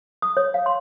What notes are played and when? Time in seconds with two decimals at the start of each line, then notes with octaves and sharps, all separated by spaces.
0.22 D#6
0.37 C#5
0.54 F5
0.66 C6